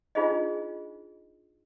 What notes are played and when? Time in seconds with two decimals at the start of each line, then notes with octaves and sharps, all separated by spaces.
0.15 D4 D#4 F4 G#4 C5 D#5